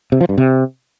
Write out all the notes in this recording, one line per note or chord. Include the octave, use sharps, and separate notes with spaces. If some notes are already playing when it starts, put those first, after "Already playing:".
C3
F3
G2
C3